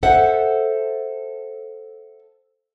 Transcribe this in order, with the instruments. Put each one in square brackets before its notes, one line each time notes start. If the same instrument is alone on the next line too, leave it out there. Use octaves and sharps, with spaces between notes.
[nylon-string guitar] A4 C5 E5 F#5